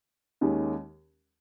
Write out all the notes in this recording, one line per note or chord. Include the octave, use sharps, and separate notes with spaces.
D#2 D#3 G#3 C#4